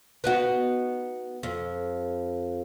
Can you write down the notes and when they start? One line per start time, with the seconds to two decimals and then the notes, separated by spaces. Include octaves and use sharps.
0.24 B3 D#4 F#4
1.43 F2